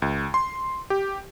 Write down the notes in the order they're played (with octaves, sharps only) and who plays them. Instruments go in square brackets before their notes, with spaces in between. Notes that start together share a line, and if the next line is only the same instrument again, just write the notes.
[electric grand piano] C#2
C6
G4